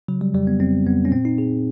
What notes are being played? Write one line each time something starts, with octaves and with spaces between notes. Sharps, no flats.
C#3 F#3
G3
F2 G3
B3
F2 C4
F2 B3
C#4
A#2 C4
D#4
A#2 G#4